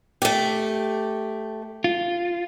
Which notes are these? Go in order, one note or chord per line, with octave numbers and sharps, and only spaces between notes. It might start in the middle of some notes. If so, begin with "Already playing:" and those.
A3 G4
F4